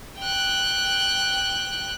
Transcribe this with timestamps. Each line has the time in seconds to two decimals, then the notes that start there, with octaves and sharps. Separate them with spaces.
0.19 G5 F#6